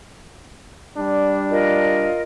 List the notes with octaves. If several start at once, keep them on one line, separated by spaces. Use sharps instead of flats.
G3 D4
F4 A#4 D#5